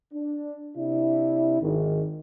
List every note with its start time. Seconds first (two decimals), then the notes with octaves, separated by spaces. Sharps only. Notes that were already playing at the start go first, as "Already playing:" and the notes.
0.13 D4
0.77 C3 D4 E4
1.60 G#1 G#2 D#3